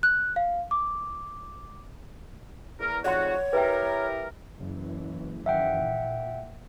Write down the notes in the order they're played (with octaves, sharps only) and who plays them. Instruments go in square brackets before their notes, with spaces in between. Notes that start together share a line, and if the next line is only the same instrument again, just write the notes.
[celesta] F#6
F5
D6
[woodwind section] E2 A#4
[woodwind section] F2 G#2 F#4 [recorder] C#5 [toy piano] D5 F#5 C6
[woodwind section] E4 G4 A#4 [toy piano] B4 E5 G5
[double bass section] F#1 E3
[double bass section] F#2 D#3 E3 [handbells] E5 F#5 G5
[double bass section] A#2